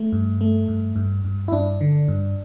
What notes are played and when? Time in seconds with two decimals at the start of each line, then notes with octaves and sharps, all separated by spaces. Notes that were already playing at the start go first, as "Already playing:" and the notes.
Already playing: A3
0.12 G2
0.41 A3
0.68 G2
0.96 G2
1.24 G2
1.48 E4
1.52 G2 D4
1.81 D3
2.08 G2